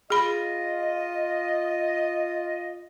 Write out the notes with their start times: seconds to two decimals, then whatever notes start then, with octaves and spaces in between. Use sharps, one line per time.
0.10 F4 G#4 D#5 B5